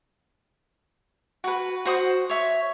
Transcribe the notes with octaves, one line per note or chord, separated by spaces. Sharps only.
F#4 B4
F#4 C5 D#6
C#5 E5